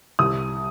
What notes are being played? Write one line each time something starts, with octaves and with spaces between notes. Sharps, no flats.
C2 D#6